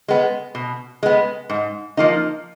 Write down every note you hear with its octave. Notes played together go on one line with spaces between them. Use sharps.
G#3 B3
B2
G#3 B3
G#2
F3 A#3 D#4